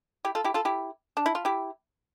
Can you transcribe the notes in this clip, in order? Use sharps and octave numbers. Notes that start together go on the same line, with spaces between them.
E4 G4
F4 A4
E4 G4
F4 A4
E4 G4
D4
E4
F4
E4 G4